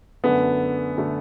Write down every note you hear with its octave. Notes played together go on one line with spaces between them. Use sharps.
F#2 D3 A3 B3
D3 A3